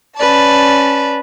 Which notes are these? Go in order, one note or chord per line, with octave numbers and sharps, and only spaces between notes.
C#4 B4 D5 A5